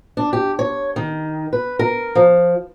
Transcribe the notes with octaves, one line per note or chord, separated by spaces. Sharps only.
D4
G4
C#5
D#3
B4
A#4
F3